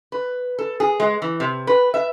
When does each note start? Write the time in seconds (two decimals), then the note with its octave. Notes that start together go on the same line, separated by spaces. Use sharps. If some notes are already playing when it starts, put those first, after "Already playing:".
0.12 B4
0.59 A4
0.80 G#4
1.00 G#3
1.22 E3
1.40 C3
1.67 B4
1.94 E5